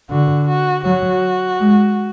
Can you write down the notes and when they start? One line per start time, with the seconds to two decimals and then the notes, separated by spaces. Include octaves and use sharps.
0.11 D3 F#4
0.48 F#4
0.85 F#3 F#4
1.60 G#3